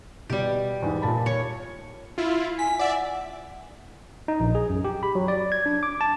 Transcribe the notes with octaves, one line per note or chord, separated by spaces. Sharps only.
B2 G3 G4
E2 G#2
A#2 A5 B5
C#5
E4 F4
G#5 B6
D5 E5 F#5
D#4
A#1
G#4
F#2
G4
B5
F#3
D5
G#6
D4
D6
A5